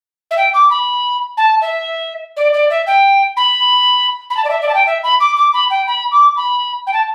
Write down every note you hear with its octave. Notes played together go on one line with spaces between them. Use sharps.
E5
G5
D6
B5
A5
E5
D5
D5
E5
G5
B5
B5
A5
D5
E5
D5
A5
G5
E5
B5
D6
D6
B5
G5
B5
D6
B5
G5
A5